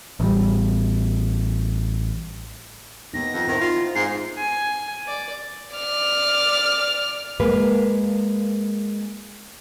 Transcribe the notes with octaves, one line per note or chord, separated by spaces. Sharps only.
A1 G3
D#2 B3 D#4 A#6
F2
D#3 C4 E4 C5
F4
G#2 C7
G#5
D5
D5 F6
G#3 A#3 B4